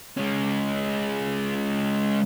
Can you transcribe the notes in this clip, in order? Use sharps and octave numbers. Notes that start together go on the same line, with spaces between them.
G#3 C#4